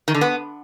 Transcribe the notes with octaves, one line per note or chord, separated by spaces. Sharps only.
D#3
D3
B3